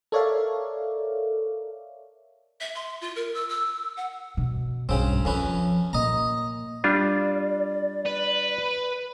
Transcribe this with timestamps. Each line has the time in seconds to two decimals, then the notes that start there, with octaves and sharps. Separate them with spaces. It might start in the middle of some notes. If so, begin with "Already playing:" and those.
0.12 A4 A#4 C#5 D5 E5 F5
2.61 E5
2.75 C6
3.01 F4
3.16 A#4
3.35 E6
3.49 E6
3.97 F#5
4.37 B2
4.89 B1 G2 C#3 C4
5.25 F2 F3 C#4 B4
5.93 A#2 D#5 A#5
6.84 G3 D4 F4 D5
8.06 B4